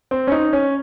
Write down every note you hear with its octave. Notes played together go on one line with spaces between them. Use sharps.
C4
C#4
D#4
C#4